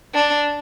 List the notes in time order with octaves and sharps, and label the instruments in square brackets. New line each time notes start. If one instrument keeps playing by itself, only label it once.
[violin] D4